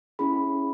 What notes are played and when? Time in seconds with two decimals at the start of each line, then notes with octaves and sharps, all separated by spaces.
0.19 C#4 E4 G#4 B5